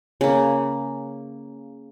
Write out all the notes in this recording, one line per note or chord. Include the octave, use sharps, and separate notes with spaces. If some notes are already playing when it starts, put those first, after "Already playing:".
C#3 A#3